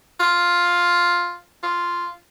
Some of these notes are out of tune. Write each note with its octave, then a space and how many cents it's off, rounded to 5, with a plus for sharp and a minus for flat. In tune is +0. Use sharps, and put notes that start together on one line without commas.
F4 +5
F4 -5